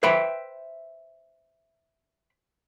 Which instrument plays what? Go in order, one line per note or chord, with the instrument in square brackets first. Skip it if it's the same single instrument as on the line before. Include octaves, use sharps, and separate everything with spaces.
[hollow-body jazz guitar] B4 C5 E5 G5 B5